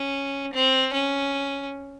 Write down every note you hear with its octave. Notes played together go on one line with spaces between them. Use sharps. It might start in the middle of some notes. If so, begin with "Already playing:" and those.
Already playing: C#4
C4
C#4